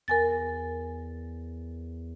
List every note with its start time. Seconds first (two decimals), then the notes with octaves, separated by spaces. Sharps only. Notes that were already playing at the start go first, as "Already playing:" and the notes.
0.08 E2 A#4 G#5 A6